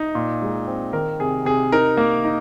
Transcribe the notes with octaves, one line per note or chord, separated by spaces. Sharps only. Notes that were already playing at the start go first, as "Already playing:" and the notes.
Already playing: D#4
A#2
G#3
C4
D#3 A#4
C3 G#4
C3 G#4
D#4 A#4
A#3
D#4